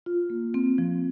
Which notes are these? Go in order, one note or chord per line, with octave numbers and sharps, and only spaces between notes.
F4
A#3
C4
F3